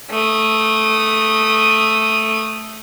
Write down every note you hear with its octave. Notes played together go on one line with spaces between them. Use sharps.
A3 D#6